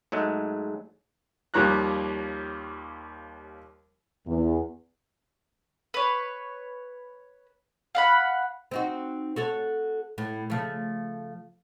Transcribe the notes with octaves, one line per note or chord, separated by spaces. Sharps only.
G#2 F#3 G#3 A3
D#2 F3 G3 C#5 A#5 F#6
E2
B4 C#5
F5 F#5 B5
C4 D#4 F#4
F#4 A4 C#5
A2
C#3 F3 A3